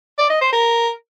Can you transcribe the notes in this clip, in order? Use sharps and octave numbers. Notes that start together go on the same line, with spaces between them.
D5
D#5
C5
A#4